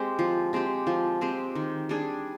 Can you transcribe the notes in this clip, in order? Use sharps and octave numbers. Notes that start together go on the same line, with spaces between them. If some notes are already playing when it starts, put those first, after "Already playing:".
Already playing: G#3 C4 G4
F3
G#3 C4 G4
F3
G#3 C4 G4
D#3
G3 D4 G#4